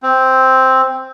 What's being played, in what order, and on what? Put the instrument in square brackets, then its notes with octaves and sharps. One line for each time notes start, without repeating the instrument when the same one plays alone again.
[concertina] C4